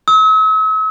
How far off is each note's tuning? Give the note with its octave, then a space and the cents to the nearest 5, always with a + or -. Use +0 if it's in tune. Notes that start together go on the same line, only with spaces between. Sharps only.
E6 -45